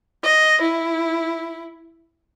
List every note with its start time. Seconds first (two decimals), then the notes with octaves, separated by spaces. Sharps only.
0.23 D#5
0.61 E4